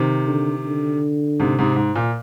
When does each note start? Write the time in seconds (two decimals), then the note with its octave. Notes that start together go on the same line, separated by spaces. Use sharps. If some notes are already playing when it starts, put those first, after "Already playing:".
Already playing: C3 D#3
0.28 D3
0.66 D3
1.40 G#2 C3
1.59 G#2 C3
1.76 G#2
1.95 A#2